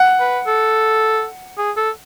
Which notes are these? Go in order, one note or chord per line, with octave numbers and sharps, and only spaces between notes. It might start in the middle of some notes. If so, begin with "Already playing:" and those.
Already playing: F#5
B4
A4
G#4
A4